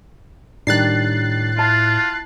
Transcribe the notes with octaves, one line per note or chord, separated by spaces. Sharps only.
A2 D#3 G3 D4 F#6 A6 C7
E4 F4 A5